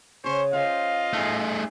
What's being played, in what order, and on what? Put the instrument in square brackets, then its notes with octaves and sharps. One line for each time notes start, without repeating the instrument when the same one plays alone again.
[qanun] C#3 C#5 [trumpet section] C#4 C5 C#6
[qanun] C#4 C5 [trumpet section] F4 D#5 F5
[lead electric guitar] A3 G#4 [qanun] D#4 C#6